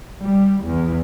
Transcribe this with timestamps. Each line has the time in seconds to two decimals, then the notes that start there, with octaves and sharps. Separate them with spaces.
0.21 G3
0.64 E2